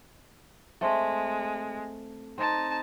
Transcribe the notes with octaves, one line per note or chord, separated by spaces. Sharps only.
G#3 A3 C4
C4 D#4 A5